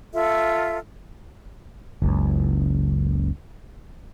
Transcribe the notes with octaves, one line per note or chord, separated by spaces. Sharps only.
F4 A4 E5
F#1 C#2